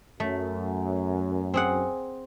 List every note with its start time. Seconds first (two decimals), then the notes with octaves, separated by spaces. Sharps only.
0.20 F#2 A3
1.54 C4 G#4 F#5